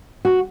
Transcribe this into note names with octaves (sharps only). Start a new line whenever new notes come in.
F#4